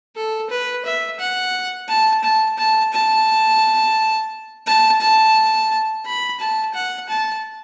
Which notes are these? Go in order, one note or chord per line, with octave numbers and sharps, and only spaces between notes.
A4
B4
E5
F#5
A5
A5
A5
A5
A5
A5
B5
A5
F#5
A5